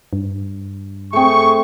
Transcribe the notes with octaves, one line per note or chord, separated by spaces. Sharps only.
G2
A3 C4 G#4 C#6